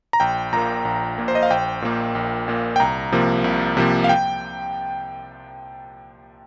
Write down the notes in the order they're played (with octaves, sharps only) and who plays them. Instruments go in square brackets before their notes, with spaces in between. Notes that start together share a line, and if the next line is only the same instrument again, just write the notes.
[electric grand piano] A#5
A#1 G5
A#2 A#3 A#5
A#1
A#2 A#3
C5
D#5
F5
A#1 G5
A#2 A#3
A#1
A#2 A#3
G5
C2 A#5
C3 F3 A#3
C2
C3 F3 A#3
F5
G5